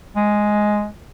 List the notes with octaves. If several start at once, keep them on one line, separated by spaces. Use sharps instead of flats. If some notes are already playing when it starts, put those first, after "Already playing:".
G#3